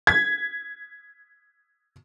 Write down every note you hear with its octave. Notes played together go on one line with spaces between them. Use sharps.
G#6 B6